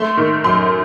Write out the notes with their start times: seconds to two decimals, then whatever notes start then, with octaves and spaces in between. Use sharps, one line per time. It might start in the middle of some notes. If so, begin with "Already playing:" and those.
Already playing: A3 C6
0.17 D#3
0.44 F#2 C6